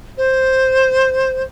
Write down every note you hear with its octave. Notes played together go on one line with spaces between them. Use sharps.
C5